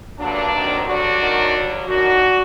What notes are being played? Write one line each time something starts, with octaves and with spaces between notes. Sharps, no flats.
G2 D3 F#3 A#3 D4
D2 C3 D#3 F#3
G2 D3 F#3 D4 F#4
F#2 D#3 F#3
G2 F#3
F#2 D#3 F#3 D4 F#4